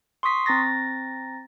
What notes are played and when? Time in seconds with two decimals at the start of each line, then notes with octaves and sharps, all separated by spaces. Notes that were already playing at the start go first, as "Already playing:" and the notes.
0.23 C6 C#6 D#6 B6 C7
0.46 C4 A#5 A6 A#6